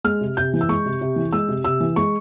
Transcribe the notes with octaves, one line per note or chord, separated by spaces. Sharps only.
G#3 F6
C3
C3 G6
E3
E6
G#3 C#6
C3
C3
E3
G#3 E6
C3
C3 E6
E3
G#3 C#6